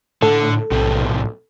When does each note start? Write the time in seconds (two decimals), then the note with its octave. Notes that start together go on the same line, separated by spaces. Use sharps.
0.22 A2 D3 A4
0.71 B1 A2 C3